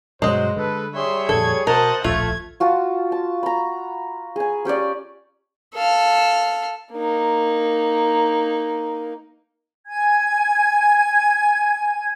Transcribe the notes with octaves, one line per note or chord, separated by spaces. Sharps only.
G2 B2 F#3 G#3 C5 D#5
D3 A4 B4
G3 G#4 C#5 E5 C6
F2 A#2 D3 A4 G#6
B2 F#4 A#4 C5 D#5 F#5 A5
D1 A#1 D#2 A3 F4 G#6
F4 F#4 A5
A5
A#5 B5
G#4 G#5
C#4 G4 C#5 D5
A4 F5
A#3 D#4
G#5 G#6